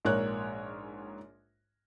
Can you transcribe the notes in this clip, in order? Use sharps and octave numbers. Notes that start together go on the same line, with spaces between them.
A#1 G#2 A#4 C#5 F#6